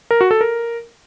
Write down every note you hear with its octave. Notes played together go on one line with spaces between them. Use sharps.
A#4
F#4
A4
A#4